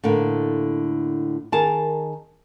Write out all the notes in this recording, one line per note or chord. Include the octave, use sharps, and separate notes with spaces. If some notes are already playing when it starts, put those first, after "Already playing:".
A2 D3 A#3
D#3 G#4 A#4 A5